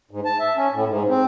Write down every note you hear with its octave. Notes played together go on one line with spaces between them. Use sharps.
G#2
A5
E5
C#4
A2
G#2
C4